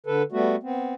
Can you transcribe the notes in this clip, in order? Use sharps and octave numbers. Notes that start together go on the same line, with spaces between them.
D3 A4 B4
G3 A3 B3 F#4
B3 C4